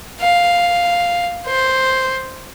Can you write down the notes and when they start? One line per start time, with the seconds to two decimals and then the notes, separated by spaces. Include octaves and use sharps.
0.21 F5
1.46 C5